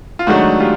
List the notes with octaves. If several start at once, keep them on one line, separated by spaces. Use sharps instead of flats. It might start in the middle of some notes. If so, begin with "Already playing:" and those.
F4
G#2 D#3 F#3 A3 D4 F#4
F4 G4